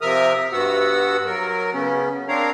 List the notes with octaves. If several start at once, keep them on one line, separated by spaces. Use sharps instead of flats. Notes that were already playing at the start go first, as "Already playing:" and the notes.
C3 F3 A#4 E5 D#6 F6
G2 B3 F#4 F#5 E6
F#3 A#4
C#3 B3 C#4
C4 D4 A#4 C#5 F5 A#5